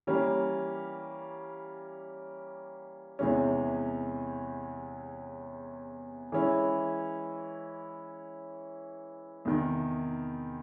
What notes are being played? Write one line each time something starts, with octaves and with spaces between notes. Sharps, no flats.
E3 G3 A#3 C#4
E2 C3 E3 G#3 C#4
E3 G#3 C#4 E4
E2 C3 D#3